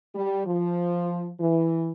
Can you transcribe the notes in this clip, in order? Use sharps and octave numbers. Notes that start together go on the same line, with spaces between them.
G3
F3
E3